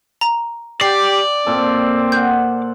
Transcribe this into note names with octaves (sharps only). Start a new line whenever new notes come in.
A#5
G4 D5 G5 C7
A#2 C4 A4
C5 F#5 G6